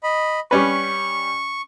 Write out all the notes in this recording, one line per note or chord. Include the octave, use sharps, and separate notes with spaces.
D#5 B5
G3 C#4 B4 C#6